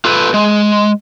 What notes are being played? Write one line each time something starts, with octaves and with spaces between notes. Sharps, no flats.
F4 A4 B4
G#3